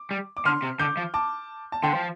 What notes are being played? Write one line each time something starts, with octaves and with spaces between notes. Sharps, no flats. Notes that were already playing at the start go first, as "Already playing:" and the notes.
Already playing: D6
G3
D6
D3 C6 F6
C3
D3 D6 G6
F3
A5 D6
A5
D3 G5 C6
F3